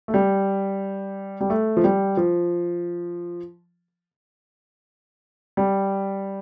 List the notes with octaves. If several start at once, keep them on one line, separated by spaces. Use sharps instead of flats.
A3
G3
G3
A3
F3
G3
F3
G3